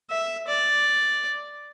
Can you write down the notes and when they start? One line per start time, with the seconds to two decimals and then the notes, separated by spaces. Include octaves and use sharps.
0.11 E5
0.48 D5